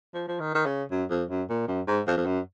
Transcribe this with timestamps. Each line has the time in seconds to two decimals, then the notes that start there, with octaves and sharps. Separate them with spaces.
0.14 F3
0.28 F3
0.40 D#3
0.55 D#3
0.66 C#3
0.91 F#2
1.10 F2
1.30 F#2
1.49 A#2
1.68 F#2
1.87 G#2
2.07 F2
2.17 F2
2.26 F#2